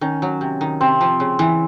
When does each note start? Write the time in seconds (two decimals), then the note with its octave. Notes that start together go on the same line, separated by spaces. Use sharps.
0.01 D#3 C#4
0.22 F#3
0.41 C3
0.61 D#3
0.81 C3 C4
1.01 F3
1.20 C#3
1.39 E3